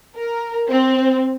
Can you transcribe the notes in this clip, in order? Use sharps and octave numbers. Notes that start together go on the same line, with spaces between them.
A#4
C4